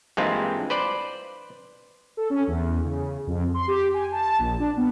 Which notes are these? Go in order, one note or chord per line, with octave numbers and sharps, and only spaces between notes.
G2 E3 G#3 A#3 C4 F4
B4 C5 D5
A4
C#4
E2
C#3
F2
C6
G4
G#5
A5
A#1
D4
B3